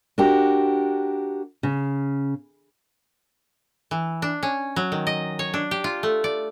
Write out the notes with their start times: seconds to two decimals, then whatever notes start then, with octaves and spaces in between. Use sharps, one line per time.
0.18 D4 F#4 G4 A#4
1.63 C#3
3.91 E3
4.22 D4
4.43 C#4
4.76 F#3
4.92 D#3
5.07 D#5
5.39 C#5
5.54 D4
5.71 G4
5.84 F4
6.03 A3
6.24 D5